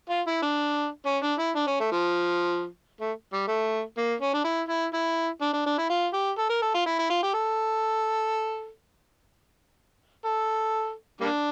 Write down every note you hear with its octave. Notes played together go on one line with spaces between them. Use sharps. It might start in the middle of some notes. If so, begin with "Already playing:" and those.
F4
E4
D4
C#4
D4
E4
D4
C#4
A3
F3
A3
G3
A3
A#3
C#4
D4
E4
E4
E4
D4
D4
D4
E4
F4
G4
A4
A#4
A4
F4
E4
E4
F4
G4
A4
A4
G3 A#3 D4